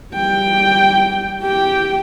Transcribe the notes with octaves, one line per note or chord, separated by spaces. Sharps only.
G3 G5
G4 G5